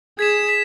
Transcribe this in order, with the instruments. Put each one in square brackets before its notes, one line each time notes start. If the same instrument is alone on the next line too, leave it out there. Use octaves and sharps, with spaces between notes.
[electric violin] G#4 [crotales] G#6 B6 E7
[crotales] B6 E7